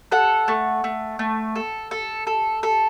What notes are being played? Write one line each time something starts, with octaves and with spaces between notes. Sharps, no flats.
A4 F#5
A3
A3
A3
A4
A4
A4
A4